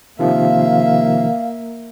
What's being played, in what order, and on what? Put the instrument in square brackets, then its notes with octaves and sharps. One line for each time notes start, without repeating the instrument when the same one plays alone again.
[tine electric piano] C3 D#3 F3 [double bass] A#3 [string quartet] E5 [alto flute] F5